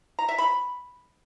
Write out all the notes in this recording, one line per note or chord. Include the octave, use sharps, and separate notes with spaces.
A#5
E5
B5